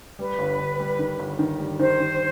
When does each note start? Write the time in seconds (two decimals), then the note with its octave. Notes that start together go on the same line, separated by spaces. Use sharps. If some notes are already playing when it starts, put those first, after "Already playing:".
0.19 G3 B4
0.39 G1
0.59 G1
0.79 G3
0.99 D#3
1.19 G1
1.39 D#3
1.59 G3
1.79 D#3 C5
2.00 D#3